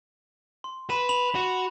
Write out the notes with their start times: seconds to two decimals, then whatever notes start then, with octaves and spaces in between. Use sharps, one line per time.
0.64 C6
0.90 B4 B5 E7
1.09 B5 F7 F#7
1.35 F#4